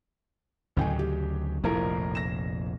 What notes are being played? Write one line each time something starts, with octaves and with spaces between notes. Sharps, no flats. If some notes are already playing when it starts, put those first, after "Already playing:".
A1 D2 C#3 F#3 G5 G#5
G4
F1 A#1 F2 A2 F4 A#4
A#6 E7